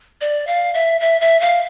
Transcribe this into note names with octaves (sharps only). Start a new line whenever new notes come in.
D5
F5
E5
E5
E5
F5